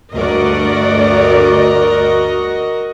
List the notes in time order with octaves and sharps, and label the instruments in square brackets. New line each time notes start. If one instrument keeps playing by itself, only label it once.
[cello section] D2 G2 D5 [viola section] F#4 A#4 D#5